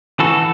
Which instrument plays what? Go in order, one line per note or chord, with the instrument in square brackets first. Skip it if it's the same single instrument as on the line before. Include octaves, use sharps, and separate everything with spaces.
[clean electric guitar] E3 F#4 A4